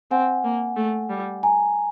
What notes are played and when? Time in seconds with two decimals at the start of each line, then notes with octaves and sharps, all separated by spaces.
0.11 C4 F#5 G#5
0.44 A#3
0.76 A3
1.10 G3
1.43 G#5 A#5